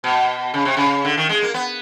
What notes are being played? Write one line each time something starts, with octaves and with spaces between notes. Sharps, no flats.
B2
C#3
C3
C#3
D3
D#3
G#3
A#3
B3